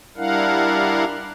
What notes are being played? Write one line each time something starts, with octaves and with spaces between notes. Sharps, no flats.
G3 D4 E4 A#4 F5 F#5